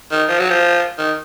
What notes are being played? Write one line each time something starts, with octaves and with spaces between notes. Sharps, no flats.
D#3
F3
F#3
F3
D#3